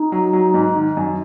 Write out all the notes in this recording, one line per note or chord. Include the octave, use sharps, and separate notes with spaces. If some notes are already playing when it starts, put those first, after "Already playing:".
Already playing: D#4
F#3
F#3
G#2
D#3
F#2